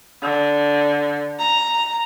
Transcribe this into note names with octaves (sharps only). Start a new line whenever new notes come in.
D3
A#5